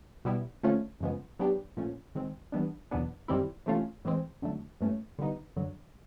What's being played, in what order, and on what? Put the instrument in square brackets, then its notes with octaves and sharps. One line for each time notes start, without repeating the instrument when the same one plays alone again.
[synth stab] B2 G3 B3 E4
D3 F3 A3 C#4 F4
F#2 C#3 F3 G#3 B3
F#3 B3 D4 G4
A#2 F3 A3 C#4
D#3 G#3 C4
E3 G3 B3 D4
E2 B2 F#3 B3 D4
F#2 D#3 G3 C4 E4
C3 E3 A3 C#4 F4
A2 E3 G#3 C4
F2 D3 F#3 A3
G2 E3 A3 C#4
D3 G3 B3 D#4
F#2 D3 F#3